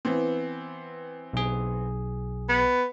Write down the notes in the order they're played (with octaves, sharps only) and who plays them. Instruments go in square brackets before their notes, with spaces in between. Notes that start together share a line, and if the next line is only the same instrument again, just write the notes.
[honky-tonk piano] E3 B3 C4
[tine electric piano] B1 G#4
[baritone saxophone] B3